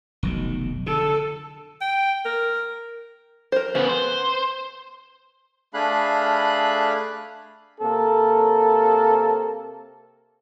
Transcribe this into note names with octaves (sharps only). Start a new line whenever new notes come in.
F1 B1 D#3
D3 A4
G5
A#4
A#4 C5
C#3 B3 B4
C5
A3 D4 G#4 F5 B5 F#6
C3 A#3 C4 A4